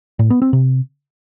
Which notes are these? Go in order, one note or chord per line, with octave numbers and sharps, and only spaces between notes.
A2
B3
C4
C3